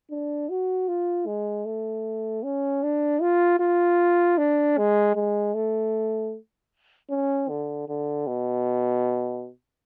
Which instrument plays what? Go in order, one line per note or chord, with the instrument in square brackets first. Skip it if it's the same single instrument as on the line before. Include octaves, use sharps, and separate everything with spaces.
[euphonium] D4
F#4
F4
G#3
A3
C#4
D4
F4
F4
D4
G#3
G#3
A3
C#4
D3
D3
B2